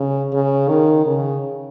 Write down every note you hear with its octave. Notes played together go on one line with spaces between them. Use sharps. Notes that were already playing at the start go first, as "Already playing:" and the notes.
Already playing: C#3
C#3
D#3
C#3